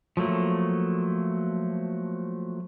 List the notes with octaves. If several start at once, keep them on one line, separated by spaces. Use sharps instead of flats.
F3 F#3 A3 A#3